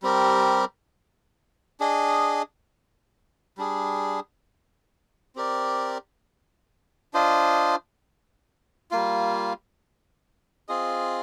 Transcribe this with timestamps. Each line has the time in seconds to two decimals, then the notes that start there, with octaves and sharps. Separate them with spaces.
0.03 G3 C4 G4 A#4
1.80 D4 G#4 D#5
3.58 G3 D4 G#4
5.36 C4 G4 A#4 D5
7.14 D4 F4 C5 D#5
8.91 G3 A#3 F4
10.69 C4 F4 G#4 D#5